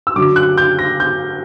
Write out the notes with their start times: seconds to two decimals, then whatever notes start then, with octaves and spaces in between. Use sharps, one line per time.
0.07 E6
0.16 F#2 D3 F#3 D6
0.36 F#6
0.58 G6
0.79 A#6
1.00 G6